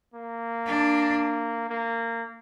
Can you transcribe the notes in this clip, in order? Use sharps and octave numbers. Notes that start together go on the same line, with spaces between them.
A#3
D4
A#3